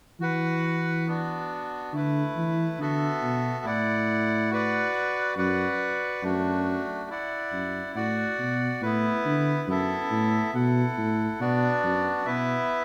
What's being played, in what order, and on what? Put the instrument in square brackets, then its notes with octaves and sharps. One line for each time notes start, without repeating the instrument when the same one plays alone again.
[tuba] E3 [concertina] F#4 B4 F#5
[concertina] B3 D4 F#4
[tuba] D3 [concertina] A3 E4 B4
[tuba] E3
[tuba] D3 [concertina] B3 F#4 A4 E5
[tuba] B2
[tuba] A2 [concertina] E4 D5 F#5
[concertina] F#4 B4 D5 F#5
[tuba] F#2 [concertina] F#4 B4 D5 F#5
[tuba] F#2 [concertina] A3 D4 F#4
[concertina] E4 D5 F#5
[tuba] F#2
[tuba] A2 [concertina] F#4 D5 F#5
[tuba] B2
[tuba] A2 [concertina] B3 E4 B4
[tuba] D3
[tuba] F#2 [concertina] B3 E4 A4 E5
[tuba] A2
[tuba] B2 [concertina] E4 A4 F#5
[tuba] A2
[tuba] B2 [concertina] B3 D4 F#4 D5
[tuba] F#2
[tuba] B2 [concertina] B3 E4 B4 E5